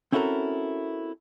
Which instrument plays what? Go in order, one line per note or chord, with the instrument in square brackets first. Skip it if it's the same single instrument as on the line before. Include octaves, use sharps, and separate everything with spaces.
[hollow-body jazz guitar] C4 C#4 E4 F#4 A4 A#4